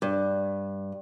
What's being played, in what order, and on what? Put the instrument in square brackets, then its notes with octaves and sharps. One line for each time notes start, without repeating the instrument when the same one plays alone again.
[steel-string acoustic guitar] G2